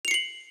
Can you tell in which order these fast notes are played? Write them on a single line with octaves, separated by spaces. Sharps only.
F7 C#7 C7 F#7